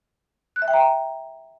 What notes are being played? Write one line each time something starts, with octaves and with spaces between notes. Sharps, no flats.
F#6
E5
G5
A#5